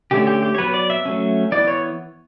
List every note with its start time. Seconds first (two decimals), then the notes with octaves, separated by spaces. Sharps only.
0.11 D3 A3 C#4 G4
0.27 G4
0.43 G4
0.55 C#5
0.58 F#3 B3 B4
0.74 D5
0.90 E5
1.05 F#3 A3 C#4
1.52 E3 B3 D5
1.68 C#5